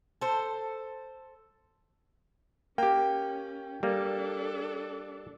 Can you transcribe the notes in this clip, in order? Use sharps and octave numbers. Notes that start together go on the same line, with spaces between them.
A4 C5
A#3 C#4 G4 G5
G3 A#3 D4 A4